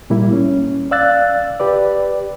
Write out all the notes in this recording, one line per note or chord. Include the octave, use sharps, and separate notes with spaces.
A#2 G3 A#3 E4
C#4
D5 F5 E6 F#6 A6
G4 B4 D5